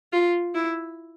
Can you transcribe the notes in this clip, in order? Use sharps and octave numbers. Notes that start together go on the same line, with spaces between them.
F4
E4